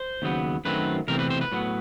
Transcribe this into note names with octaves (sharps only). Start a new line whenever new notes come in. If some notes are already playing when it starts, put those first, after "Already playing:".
Already playing: C5
D#2 C#3 F#3 B3
F#2 D#3 F#3 A3 C4 B4
E2 C3 E3 A3 C4 A#4
B4
C5
B4
A2 F#3 B3